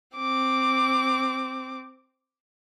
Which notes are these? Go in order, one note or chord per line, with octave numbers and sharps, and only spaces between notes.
C4 D6